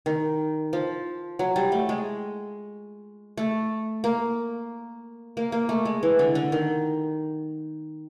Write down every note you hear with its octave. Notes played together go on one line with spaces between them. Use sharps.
D#3
F3
F#3
G3
A3
G#3
A3
A#3
A#3
A#3
A3
G#3
E3
D3
D3
D#3